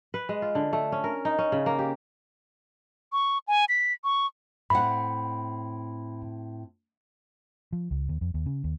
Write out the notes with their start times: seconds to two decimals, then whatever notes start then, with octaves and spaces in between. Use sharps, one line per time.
0.14 B4
0.29 G#3
0.42 F4
0.55 D3
0.73 A3
0.92 C#4
1.04 A#4
1.25 D#4
1.39 C#4
1.52 C#3
1.66 A#3
1.79 G4
3.12 C#6
3.48 G#5
3.69 B6
4.04 C#6
4.70 A2 C4 F#5 B5
7.73 F3
7.91 C#2
8.09 D#2
8.21 F2
8.34 D#2
8.46 C#3
8.64 D#2